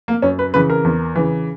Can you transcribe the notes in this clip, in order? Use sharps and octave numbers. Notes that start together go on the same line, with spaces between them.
A#3
F#2 C#4
B4
C#3 E3 B4
A#4
E2
C#3 E3